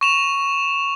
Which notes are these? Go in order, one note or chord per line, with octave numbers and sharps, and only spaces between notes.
C#6 E7 F7